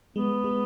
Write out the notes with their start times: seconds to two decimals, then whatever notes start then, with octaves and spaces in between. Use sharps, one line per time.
0.16 G#3 B3
0.44 G#3